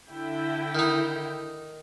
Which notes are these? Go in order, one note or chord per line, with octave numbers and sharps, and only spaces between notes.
D3 E4 G5
D#3 D#4